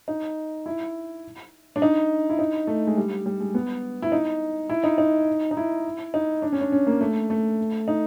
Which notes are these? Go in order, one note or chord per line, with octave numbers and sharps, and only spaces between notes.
D#4
E4
D4
D#4
E4
D#4
A3
G#3
G3
G3
G#3
B3
E4
D#4
E4
D#4
D#4
D#4
E4
D#4
D4
C#4
D4
C#4
A#3
A3
A3
D#4